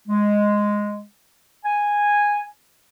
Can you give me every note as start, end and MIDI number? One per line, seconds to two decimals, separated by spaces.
0.08 1.05 56
1.65 2.46 80